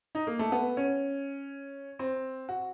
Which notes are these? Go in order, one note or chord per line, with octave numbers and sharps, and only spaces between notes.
D#4
A#3
A3
B3
C#4
C4
F#4